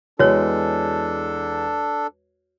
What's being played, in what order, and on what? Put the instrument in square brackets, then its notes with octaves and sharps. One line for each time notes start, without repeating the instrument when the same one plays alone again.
[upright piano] E2 G#3 [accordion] D4 A4 [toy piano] F#4 C#5